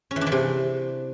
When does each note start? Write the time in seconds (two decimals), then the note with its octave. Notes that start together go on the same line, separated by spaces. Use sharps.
0.11 C#4
0.16 E3
0.21 D4
0.27 E3
0.32 C3